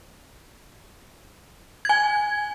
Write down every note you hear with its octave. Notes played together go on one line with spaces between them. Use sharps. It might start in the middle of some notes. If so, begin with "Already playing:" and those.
G#5 G#6